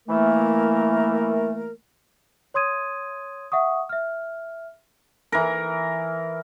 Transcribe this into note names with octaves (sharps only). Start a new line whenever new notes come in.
E3 A3 A#3 A#4
C#5 C6 D#6 G#6 D#7
E5 F#5 C#6 D#6
E5 F6
E3 A#4